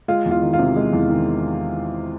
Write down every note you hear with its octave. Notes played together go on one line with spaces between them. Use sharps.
G#3 F4
E2
F4
D#3
F4
C3
G#3
E2
D#3